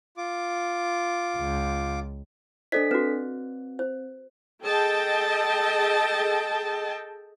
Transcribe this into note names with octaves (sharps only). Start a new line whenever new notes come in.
F4 D6
C#2
D4 A4 C5 D5 D#5 B6
C4 F#4 B4
C5
G#4 A4 D#5 G5 A5